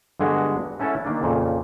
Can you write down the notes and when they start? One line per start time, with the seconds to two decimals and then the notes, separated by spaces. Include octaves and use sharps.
0.20 G2 D3 G#3 B3 F#4
0.79 A3 C#4 E4 A4 F#5 A5
1.05 D#3 A#3 D4
1.23 F2 A#2 C#3